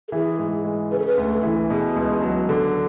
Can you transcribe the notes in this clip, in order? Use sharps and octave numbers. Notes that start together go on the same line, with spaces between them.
A4
E3 G#4
G#2
G#3
C#3 B4
A4
B4
D2
A4
E3
B2 G#4
C#2
F#3
D3